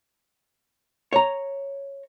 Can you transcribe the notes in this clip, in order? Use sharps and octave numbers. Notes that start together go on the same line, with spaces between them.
C#5 A#5